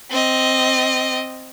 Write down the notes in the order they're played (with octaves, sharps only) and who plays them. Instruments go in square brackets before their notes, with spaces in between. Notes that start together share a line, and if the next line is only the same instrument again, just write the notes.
[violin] C4 D#5